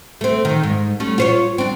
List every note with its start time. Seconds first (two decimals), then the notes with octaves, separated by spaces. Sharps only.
0.21 A3 C4
0.45 D#3
0.63 G#2
1.00 G3 A3 C#4
1.18 F4 C5 C#5
1.58 C4 D4